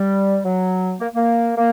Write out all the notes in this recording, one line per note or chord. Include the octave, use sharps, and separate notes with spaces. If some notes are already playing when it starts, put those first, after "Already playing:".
Already playing: G3
F#3
A#3
A#3
A#3